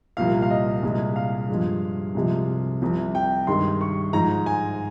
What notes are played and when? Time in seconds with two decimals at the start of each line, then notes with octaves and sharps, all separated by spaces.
0.17 C2 A#2 F3 F5
0.42 F5
0.50 D#5
0.83 C2 A#2 G#3
1.16 F5
1.49 G2 F3 G#3
2.15 C2 C3 F3 G#3
2.82 C2 C3 F3
3.15 G5
3.47 G2 D#3 G#3 C6
3.81 C#6
4.13 G#2 F3 G#3 A#5
4.46 G#5